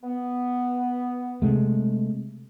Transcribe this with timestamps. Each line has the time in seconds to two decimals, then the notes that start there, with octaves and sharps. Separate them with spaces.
0.04 B3
1.42 C3 G#3 A3